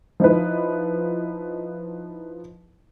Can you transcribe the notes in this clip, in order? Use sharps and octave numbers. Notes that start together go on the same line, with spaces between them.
F3 D#4 E4 B4